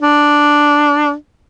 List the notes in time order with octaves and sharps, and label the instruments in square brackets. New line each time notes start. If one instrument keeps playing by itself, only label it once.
[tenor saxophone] D4